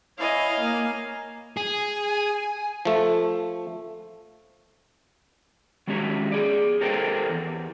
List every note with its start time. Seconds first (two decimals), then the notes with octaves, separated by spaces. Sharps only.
0.18 E4 C#5 D#5 F5 G#5
0.61 A#3
1.57 G#4 G#5
2.85 F3 A3
5.87 D#3 F#3 G#3 C#4 G4 C#5
6.32 G#4 D5
6.81 G4 A4 A#4 C5 C#5 G5
7.30 E2